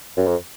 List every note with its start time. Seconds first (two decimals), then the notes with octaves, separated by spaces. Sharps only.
0.17 F#2
0.26 F2